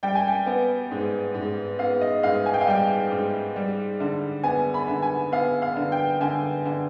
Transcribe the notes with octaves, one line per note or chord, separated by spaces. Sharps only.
G3 G5
G#5
G5
B3
G#2
G#2
B3 F5
D#5
G#2 F5
G#5
G5
F5
G3 G5
G#2
G3
D3
B3 G#5
B5
D3
G#5
B3 F5
F5
D3
G5
D3 G#5
D3